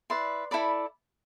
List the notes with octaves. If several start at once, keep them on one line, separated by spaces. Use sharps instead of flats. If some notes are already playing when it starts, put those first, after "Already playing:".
E4 B4 D5 C6
E4 A4 D5 B5